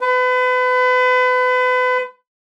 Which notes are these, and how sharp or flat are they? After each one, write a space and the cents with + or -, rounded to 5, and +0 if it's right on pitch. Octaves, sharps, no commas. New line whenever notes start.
B4 +35